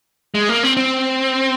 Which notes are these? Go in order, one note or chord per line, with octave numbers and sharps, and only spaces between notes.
G#3
A#3
C4
C4